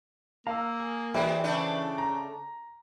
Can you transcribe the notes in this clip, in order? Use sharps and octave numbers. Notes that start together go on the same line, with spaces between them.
A#3 F5 A#5 E6
G#4
E3 F#3 G#3 C4 E4 G5 B5
C#3 A3 D4 A4
A#5